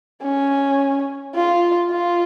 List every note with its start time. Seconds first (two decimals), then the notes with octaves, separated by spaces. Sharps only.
0.23 C#4
1.35 F4
1.90 F4